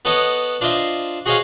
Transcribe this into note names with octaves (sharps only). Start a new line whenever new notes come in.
B3 A4 C#5 D#5 F#5
D4 F4 C5 D#5 E5
F#4 G#4 C5 C#5 D#5 F5